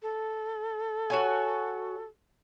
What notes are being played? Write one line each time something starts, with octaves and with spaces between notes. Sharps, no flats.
A4
F#4 C#5 G#5